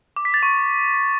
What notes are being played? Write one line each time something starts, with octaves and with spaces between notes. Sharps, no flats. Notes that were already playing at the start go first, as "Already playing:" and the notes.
D6
B6
A6
C#6